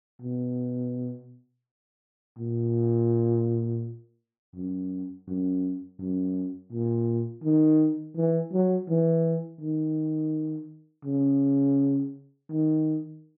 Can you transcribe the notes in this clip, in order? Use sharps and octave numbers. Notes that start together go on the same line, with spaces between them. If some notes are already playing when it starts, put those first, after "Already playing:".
B2
A#2
F#2
F#2
F#2
A#2
D#3
E3
F#3
E3
D#3
C#3
D#3